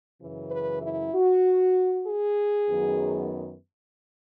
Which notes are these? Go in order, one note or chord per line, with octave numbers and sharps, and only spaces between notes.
F#2 C#3 E3
B4
E4
F#4
G#4
F#2 D#3 F#3 B3